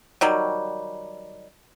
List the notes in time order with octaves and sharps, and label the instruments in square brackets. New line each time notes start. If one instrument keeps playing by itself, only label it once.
[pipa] D#3 F#3 G3